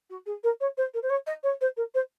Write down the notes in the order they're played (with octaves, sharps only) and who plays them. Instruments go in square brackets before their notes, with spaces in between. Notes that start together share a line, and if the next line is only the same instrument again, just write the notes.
[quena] F#4
G#4
A#4
C#5
C5
A#4
C5
C#5
D#5
C#5
C5
A#4
C5